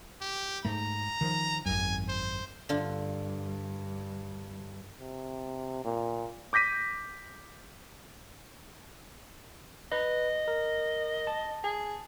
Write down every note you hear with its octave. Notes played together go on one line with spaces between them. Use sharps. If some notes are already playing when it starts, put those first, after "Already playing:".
G4
G#2 A3 A#5
D#3 F3
G#1 F#2 G#5
C5
G2 D3 D4 F4
C3
A#2
D6 G6 A#6 B6 D#7
B4 D#5
A#4
A5
G#4